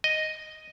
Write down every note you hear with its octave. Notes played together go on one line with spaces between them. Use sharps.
D#5